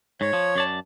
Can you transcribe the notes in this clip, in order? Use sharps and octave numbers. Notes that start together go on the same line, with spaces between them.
G#2 C#5
F3
F#2 D5 A5